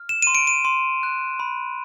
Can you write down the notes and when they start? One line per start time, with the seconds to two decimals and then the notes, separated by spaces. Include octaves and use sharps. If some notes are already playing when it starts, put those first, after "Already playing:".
Already playing: F6
0.09 E7
0.22 C6 D#7
0.35 D7
0.47 D#7
0.65 C6
1.03 F#6
1.40 B5